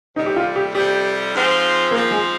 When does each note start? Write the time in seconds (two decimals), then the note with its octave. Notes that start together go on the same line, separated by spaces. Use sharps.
0.16 F2 C3 G3 D#4
0.26 G4
0.36 F4
0.56 G4
0.75 F2 C3 G3 G4
1.33 G#2 F3 C4 F4
1.91 G#2 F3 A#3 C4 F4
2.11 G#3